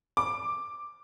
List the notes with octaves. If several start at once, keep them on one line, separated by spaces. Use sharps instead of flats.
D6